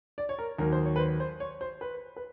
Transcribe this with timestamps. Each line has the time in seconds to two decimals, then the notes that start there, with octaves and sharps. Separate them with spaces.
0.18 D5
0.29 C#5
0.39 A#4
0.59 D#2 D#3 F#3 A#4
0.72 C5
0.85 C#5
0.96 B4
0.99 C5
1.20 C5
1.40 C#5
1.61 C5
1.81 B4
2.16 B4